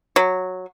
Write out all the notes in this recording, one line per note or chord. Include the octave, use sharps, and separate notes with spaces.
F#3